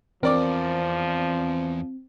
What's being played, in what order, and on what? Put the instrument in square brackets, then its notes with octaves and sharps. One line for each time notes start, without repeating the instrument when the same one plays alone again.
[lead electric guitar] E2 [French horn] F3 [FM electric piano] C4 [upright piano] A#4 D5 D6